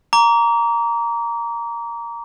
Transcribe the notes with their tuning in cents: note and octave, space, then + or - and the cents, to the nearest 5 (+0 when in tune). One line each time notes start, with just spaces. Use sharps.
A#5 +0 D6 -35